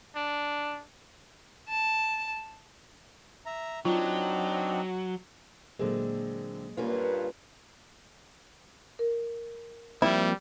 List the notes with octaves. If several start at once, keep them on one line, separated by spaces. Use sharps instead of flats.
D4
A5
E5 A#5
F#3 C4 D4 D#4 F4
A#2 D3 F#3 G#3 A#3 C4
G2 A#2 A#3 C#4 F4 B4
A#4
F3 G3 A#3 C4 E4